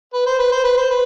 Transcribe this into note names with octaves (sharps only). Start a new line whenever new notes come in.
B4
C5
B4
C5
B4
C5
B4